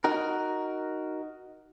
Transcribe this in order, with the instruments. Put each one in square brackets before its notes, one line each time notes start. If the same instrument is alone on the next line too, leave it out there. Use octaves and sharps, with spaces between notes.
[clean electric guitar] D#4 F#4 A#4